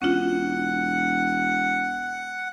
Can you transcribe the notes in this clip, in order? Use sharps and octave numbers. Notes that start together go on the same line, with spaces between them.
E1 C#4 D4 F4 F#5